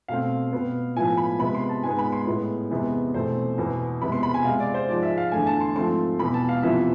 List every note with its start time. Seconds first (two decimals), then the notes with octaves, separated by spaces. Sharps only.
0.08 B2 A3 C4 F5
0.53 B2 B3
0.96 A2 F3 B3 G#5
1.17 B5
1.39 C3 G#3 B3 B5
1.55 C6
1.69 A5
1.83 G#2 G#3 B3 G#5
1.99 B5
2.12 C6
2.27 A2 G#3 B3
2.70 E2 C3 G#3 B3
3.14 E2 B2 A3 C4 C5
3.58 E2 B2 B3
4.01 E2 C3 G#3 B3 B5
4.12 C6
4.23 B5
4.34 G#5
4.45 C3 G#3 C4 F5
4.60 D5
4.74 C5
4.88 G#2 F3 G#3 D5
5.03 E5
5.18 F5
5.32 E2 D3 A3 G#5
5.47 A5
5.61 C6
5.76 G#2 F3 A3 C4 C6
6.19 E2 B2 B3 B5
6.34 A5
6.49 F5
6.63 F2 C3 E3 B3 E5